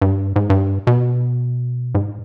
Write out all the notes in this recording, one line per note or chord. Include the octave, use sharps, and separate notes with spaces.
G2
G#2
G2
B2
G#2